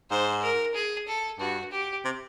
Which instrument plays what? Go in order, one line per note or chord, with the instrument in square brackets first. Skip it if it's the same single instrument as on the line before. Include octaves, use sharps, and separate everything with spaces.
[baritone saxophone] G#2 [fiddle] C5
[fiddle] A#4
G#4
A4
[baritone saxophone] G2 [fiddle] F#4
[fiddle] G4
[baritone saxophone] C3